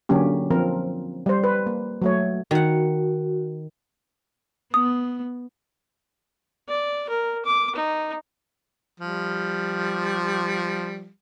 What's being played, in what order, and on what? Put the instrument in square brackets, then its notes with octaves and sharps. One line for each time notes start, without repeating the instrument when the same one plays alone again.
[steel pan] D3 F#3 A#3 C#4 G4
F3 C4 A#4
G3 C5
B4
A#3
F#3 A3 C#5
[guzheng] D#3 F#5 [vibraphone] F#4
[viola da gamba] B3 [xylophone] D#6
[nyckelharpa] D5
A#4
D6
D#4
[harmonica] F3 G3